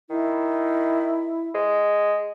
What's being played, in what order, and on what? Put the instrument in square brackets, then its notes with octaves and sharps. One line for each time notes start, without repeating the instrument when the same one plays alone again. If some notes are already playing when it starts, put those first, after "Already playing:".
[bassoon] D#3 [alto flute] E4
[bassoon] G#3